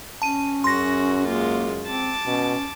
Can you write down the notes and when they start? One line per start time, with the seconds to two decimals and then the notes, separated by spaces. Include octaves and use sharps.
0.22 C#4 A5 D#7
0.64 F#2 F#4 G#4 C6 A#6
1.27 G#3 A#3 F4
1.86 C4 A5 D6
2.26 B2 C#4